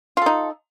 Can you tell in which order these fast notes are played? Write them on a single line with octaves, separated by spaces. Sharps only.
F4 A4 D#4